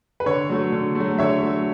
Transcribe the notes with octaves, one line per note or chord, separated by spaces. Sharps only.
B4
D3 C#5
F#3 A3
D3
F#3 A3
D3 C#5 E5
F#3 A3